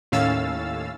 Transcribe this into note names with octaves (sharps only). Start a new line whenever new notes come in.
D#2 A2 C#4 F5 E6 A6